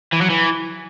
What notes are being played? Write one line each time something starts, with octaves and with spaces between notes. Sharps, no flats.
E3
F#3
E3